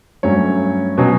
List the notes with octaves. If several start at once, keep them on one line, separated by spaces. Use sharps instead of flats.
G2 F#3 A3 C#4 C#5
B2 F#3 C#4